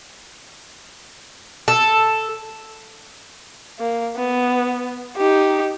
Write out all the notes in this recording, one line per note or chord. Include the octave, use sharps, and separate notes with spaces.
A4
A#3
B3
D#4 G4